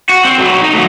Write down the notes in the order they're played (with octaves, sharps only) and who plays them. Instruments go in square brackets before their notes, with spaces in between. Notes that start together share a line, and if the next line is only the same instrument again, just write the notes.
[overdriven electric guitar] F#4
C4
B1 F#3
D#4
D2 F#3